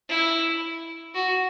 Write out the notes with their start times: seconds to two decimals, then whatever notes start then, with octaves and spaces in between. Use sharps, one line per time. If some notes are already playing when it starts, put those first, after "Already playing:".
0.09 E4
1.14 F#4